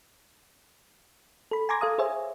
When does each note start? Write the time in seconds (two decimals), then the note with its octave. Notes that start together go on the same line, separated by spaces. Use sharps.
1.51 A4 B5
1.69 G#5 A#5 C6 D6 G#6 A#6
1.81 A4 F5 D#6
1.98 G#4 C5 C#5 E5 G#5